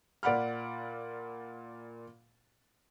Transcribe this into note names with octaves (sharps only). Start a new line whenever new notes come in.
A#2 D5 F#5 B5 F6